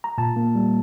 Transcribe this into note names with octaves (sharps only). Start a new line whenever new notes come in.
A#5
A#2 A5
A#3
G3